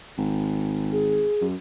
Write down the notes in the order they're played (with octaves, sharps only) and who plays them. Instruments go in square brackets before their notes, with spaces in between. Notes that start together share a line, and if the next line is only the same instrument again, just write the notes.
[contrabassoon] G#1
[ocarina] G#4
[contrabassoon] F#2